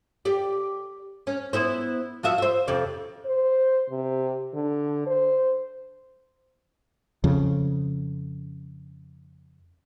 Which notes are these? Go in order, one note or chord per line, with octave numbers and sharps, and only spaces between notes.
G4 D5
C#4
B3 E4 C5
F3 F#4 E5
C5 E5
F2 C3 D5
C5
C3
D3
C5
F2 C#3